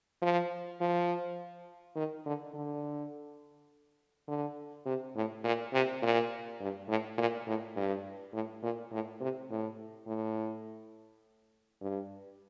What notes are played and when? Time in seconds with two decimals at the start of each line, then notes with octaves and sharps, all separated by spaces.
0.22 F3
0.81 F3
1.96 D#3
2.26 D3
2.54 D3
4.28 D3
4.86 C3
5.16 A2
5.44 A#2
5.73 C3
6.02 A#2
6.61 G2
6.89 A2
7.18 A#2
7.47 A2
7.76 G2
8.34 A2
8.63 A#2
8.92 A2
9.21 C3
9.50 A2
10.07 A2
11.81 G2